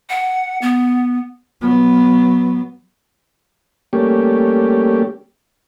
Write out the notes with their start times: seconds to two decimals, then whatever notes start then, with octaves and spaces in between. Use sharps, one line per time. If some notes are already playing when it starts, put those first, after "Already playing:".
0.10 F#5
0.62 B3
1.61 F#3 B3
3.93 G3 A3 A#3 C#4 G4